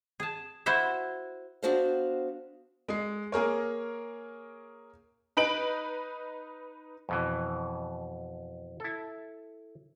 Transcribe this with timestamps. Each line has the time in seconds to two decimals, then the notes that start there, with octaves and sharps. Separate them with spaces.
0.20 G#4 A5
0.66 E4 F#4 C5 E5
1.63 B3 D4 F#4 C5 E5 F5
2.88 G#3 C7
3.32 A#3 G#4 A#4 C#5
5.37 D#4 B4 D7 F#7
7.09 F2 B2 E3
8.80 E4 A4